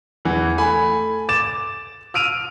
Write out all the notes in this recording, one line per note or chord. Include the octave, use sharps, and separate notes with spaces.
E2 E3
A3 G#5 B5
D6 A6 E7
E6 F6 D7 D#7 F7